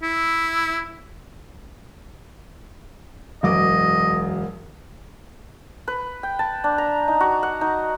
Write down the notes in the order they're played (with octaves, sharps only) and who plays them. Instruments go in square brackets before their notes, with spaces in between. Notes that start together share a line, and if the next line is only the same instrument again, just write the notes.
[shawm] E4
[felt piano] E1 F#2 D6 [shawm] D#5
[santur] B4
G5
A5
D4
A#5
D#4
F#4
F#5
D#4